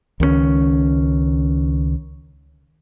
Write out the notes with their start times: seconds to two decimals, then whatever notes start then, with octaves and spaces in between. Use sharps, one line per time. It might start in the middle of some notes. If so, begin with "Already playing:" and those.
0.20 C#2 D#3 G3 C#4